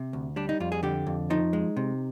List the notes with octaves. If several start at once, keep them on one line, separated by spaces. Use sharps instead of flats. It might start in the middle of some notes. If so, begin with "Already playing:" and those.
Already playing: C3
D2
G3 D4
D#4
F2 F4
G#4
D3 G4
F2
F3 D#4
G#3
C3